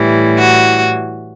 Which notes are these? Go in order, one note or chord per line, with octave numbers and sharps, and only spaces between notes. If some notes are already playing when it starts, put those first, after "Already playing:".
Already playing: A2 E3 G3
F#4